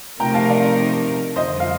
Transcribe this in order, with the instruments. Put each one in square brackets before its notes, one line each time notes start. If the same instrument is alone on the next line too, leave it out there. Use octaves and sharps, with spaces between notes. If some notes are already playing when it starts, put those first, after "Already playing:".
[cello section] C3 F3 A3 D#4 A#4 [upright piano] G5 A#5
[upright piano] F5 A5
D5 F5
[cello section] F2 D3 G3 [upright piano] C5 D#5
[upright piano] F5